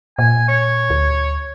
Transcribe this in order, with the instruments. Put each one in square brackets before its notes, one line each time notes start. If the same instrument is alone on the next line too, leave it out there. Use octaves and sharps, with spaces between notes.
[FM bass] A#2 [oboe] G#5
[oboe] C#5
[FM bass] D2